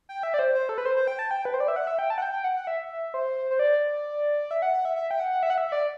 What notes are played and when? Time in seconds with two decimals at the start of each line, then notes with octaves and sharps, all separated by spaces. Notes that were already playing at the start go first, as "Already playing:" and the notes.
0.09 G5
0.23 E5
0.34 D5
0.39 C5
0.55 C5
0.69 A4
0.78 B4
0.85 C5
0.97 C5
1.07 G5
1.19 A5
1.31 G5
1.45 B4
1.54 C5
1.60 D5
1.68 E5
1.76 F#5
1.87 E5
1.99 G5
2.10 A5
2.18 F#5
2.22 G5
2.33 G5
2.44 F#5
2.57 F#5
2.67 E5
3.14 C5
3.51 C5
3.59 D5
4.51 E5
4.62 F#5
4.74 F#5
4.85 E5
4.96 E5
5.11 G5
5.20 F#5
5.43 E5
5.50 F#5
5.58 E5
5.72 D5